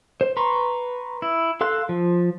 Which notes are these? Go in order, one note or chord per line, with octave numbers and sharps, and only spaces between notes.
C5
B4 A#5 C6 C#6
E4
A4 F5 C6 F#6
F3